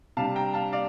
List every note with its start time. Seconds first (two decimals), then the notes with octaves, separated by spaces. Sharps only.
0.17 C3 G3 D4 F5 A5
0.36 G5 A#5
0.54 F5 A5
0.72 D5 F5